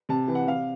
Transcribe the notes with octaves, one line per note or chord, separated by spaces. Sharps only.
C3 A5
E3
F#5
C3 F5